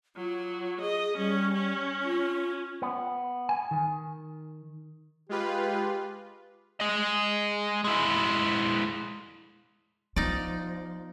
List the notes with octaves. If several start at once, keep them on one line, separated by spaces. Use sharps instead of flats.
F#3 F4
G#4 D#5
G3 C#4
C#4
F4
B3
G#5
D#3
G#3 F4 G4 B4
G#4 D#5
G#3 E4
F3 B3 D#4 D5